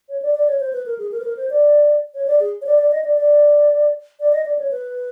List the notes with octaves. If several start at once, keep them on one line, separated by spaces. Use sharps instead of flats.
C#5
D5
D5
C#5
C5
B4
A#4
G#4
A#4
B4
A#4
C5
D5
C#5
D5
G#4
C#5
D5
D5
D#5
D5
D5
D5
D#5
D5
C#5
B4